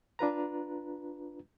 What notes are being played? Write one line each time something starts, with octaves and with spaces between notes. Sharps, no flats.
D4 F4 B4 A#5